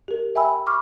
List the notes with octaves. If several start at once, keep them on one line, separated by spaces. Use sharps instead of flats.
G4 A#4
E5 G5 G#5 B5 E6
B5 C#6 D6 F6